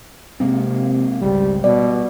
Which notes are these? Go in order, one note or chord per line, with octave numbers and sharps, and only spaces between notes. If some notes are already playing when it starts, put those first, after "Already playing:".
C3 G#3 A#3 C4
G#1 C#2 G#2 G3
B2 G3 D5